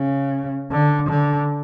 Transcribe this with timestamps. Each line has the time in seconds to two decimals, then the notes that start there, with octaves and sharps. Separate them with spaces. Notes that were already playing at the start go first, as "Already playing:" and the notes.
Already playing: C#3
0.71 D3
1.09 D3